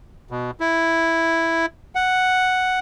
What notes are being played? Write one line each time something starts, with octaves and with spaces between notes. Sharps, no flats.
B2
E4
F#5